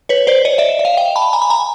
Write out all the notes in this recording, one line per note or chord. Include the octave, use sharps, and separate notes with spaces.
B4 C#5
C5 D5
C#5 D#5
D5 E5
E5
D#5 F5
F5 G5
A5 B5
G#5 A#5
B5
G#5 A#5